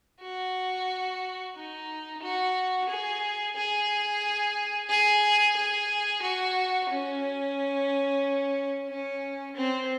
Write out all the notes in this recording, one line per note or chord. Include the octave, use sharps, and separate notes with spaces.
F#4
D#4
F#4
G#4
G#4
G#4
G#4
F#4
C#4
C#4
C4